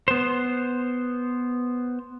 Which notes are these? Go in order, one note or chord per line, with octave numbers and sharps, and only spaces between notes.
B3 C5